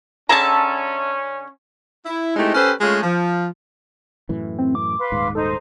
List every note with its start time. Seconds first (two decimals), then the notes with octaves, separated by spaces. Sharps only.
0.29 D3 C#4 G#4 E5 A5 A#5
2.06 E4
2.36 G#3 A3 C4 D#4 E4 G4
2.54 C#4 G4 A4 B4 C5
2.81 G#3 A3 C#4 F4 G#4
3.03 F3
4.29 F#2 A2 E3
4.58 C4
4.75 D6
4.99 B4 F5 C6
5.12 D#1 G#2
5.35 D#4 A4 C5